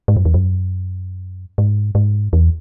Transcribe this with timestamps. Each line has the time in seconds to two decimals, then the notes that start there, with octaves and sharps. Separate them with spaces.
0.08 G#2
0.16 F#2
0.25 E2
0.34 F#2
1.58 G#2
1.95 G#2
2.33 E2